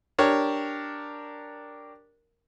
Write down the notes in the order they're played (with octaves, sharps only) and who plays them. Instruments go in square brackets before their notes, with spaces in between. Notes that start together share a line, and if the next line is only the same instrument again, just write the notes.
[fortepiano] D4 G4 A#4 C#5